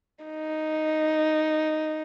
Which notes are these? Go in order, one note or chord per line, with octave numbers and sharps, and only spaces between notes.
D#4